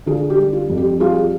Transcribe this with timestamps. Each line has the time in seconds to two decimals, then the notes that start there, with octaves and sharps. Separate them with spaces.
0.06 D3 F4 G#4
0.30 G4
0.38 G3
0.53 F4
0.69 F2
0.77 G4
1.00 G3 F4 G#4